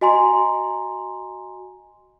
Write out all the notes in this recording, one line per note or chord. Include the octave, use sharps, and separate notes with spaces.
F#4 D#5 G#5 A#5 C6